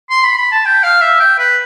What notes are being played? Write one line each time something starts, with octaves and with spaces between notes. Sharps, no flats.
C6
B5
B5
A5
G5
F5
E5
G5
B4